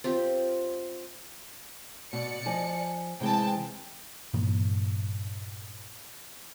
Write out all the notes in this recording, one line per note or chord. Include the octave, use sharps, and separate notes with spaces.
C4 F4 G4
B2 D5 C#7
F3 D#5 G#5
C3 E3 G#3 G5 A5
G2 A#2 E3 A#3